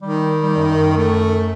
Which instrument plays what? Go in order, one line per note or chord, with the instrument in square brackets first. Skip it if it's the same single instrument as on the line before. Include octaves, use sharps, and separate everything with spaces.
[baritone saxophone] D#3 [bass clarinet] G3
[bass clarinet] G3
F#2
[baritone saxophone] A3